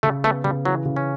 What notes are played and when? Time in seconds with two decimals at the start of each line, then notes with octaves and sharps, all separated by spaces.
0.03 C#3 A3
0.24 A3 B3
0.44 C#3 G3
0.65 E3 F#3
0.85 C#3
0.96 C#4